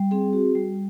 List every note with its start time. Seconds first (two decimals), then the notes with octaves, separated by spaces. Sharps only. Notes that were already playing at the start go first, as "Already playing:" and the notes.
Already playing: G3
0.11 C4 G#4
0.33 F#4
0.55 G3